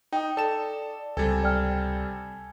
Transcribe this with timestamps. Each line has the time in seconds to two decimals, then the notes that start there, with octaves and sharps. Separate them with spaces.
0.13 D#4 G5 D#6
0.37 A4 D5 A5 E7
1.17 C#2 C3 G3 A4 G#5 G#6
1.43 D5 G5 F6